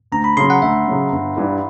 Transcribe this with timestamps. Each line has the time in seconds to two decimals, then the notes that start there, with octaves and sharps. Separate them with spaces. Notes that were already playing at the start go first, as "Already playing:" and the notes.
0.12 D2 A#5
0.24 B5
0.37 C#3 F#3 C6
0.50 F#5
0.62 D2 E5
0.88 C#3 F#3
1.12 G1
1.37 G2 E3 G3